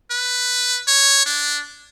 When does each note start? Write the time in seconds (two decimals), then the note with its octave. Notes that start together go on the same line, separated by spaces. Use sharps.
0.11 B4
0.88 C#5
1.26 D4